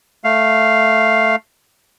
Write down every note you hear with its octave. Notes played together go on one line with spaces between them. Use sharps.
A3 F5